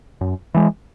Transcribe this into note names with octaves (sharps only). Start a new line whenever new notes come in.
F#2
E3 G#3